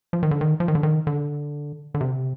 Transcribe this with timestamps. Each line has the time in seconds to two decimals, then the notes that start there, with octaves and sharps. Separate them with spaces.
0.13 F3
0.23 D#3
0.31 D3
0.41 D#3
0.60 F3
0.68 D#3
0.75 D3
0.83 D#3
1.07 D3
1.94 D3
2.01 C3